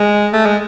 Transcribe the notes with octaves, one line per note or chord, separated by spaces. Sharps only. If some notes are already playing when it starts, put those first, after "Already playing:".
Already playing: G#3
A3
G#3